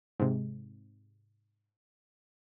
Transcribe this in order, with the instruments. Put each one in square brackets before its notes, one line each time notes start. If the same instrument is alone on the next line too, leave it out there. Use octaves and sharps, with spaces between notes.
[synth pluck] G#2 C3